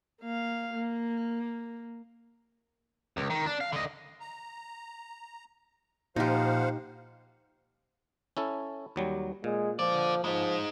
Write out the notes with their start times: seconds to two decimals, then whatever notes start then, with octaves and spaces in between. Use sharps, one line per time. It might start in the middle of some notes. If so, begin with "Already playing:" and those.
0.21 A#3 F5
0.74 A#3
3.17 C#2
3.30 D#3
3.46 D4
3.61 F5
3.73 D3 D#5
4.20 A#5
6.16 A#2 F3 D#4 G4 C5 F5 F#5
8.37 C#4 E4 A4
8.96 D#2 F#3 G3
9.44 A#2 G#3
9.79 D3 F3 D5
10.24 F3 G#3 D#4